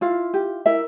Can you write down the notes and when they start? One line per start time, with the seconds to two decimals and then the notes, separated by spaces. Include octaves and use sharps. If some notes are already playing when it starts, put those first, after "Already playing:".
0.01 E4 F4 F5
0.34 G4
0.66 E4 A#4 E5